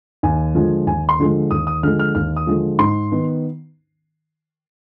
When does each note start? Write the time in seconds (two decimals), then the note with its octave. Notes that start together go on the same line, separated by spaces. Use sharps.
0.23 D#2 G#5
0.55 D3 F3 G#3
0.86 D#2 G#5
1.09 C6
1.20 D3 F3 G#3
1.51 D#2 D#6
1.67 D#6
1.83 D3 F3 G#3 F6
1.99 F6
2.15 D#2 F6
2.36 D#6
2.47 D3 F3 G#3
2.79 G#2 C6
3.12 D#3 B3